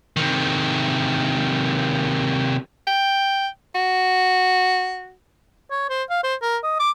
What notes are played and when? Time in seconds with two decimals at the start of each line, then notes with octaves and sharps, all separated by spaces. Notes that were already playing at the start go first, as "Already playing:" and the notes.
0.17 C3 D#3
2.87 G5
3.75 F#4
5.71 C#5
5.90 C5
6.10 F5
6.24 C5
6.42 A#4
6.63 D#5
6.80 D6